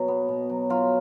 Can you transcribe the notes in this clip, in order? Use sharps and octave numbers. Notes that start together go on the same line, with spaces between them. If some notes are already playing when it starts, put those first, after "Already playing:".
Already playing: B2 F#3
B3
B2
F#3
F#3 F4